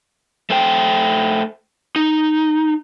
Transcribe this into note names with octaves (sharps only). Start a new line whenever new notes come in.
A3 C5 G5
D#4